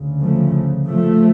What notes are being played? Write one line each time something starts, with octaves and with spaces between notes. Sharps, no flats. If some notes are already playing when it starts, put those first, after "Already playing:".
Already playing: D2 C#3
F3 A3
F3 A3